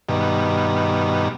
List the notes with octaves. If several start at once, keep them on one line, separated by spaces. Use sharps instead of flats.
G2 B2 D#3